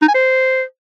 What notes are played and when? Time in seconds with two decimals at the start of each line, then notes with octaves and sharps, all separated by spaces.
0.02 D#4
0.08 G#5
0.14 C5